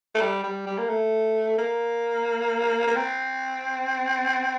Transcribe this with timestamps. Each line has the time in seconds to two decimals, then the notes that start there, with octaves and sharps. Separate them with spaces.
0.15 A3
0.21 G3
0.44 G3
0.66 G3
0.78 A#3
0.89 A3
1.58 A#3
2.87 A#3
2.96 C4